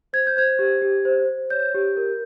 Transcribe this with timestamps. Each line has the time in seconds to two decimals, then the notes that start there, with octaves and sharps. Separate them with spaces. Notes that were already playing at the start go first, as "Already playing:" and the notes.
0.13 C5 G#6
0.27 G6
0.37 C5 G#6
0.59 G4
0.82 G4
1.05 C5
1.29 C5
1.50 C#5 G6
1.74 G4
1.97 A#4